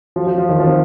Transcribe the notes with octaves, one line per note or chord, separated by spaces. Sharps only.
F3
F3
F3
D#3
F3
C4